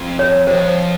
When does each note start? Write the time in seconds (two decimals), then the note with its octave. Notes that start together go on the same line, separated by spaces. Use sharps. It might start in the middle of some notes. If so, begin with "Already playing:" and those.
Already playing: F2
0.19 C#5
0.47 F2 C5